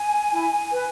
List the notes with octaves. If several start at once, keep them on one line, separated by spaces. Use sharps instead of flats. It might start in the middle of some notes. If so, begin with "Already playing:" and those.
Already playing: G#5
E4
B4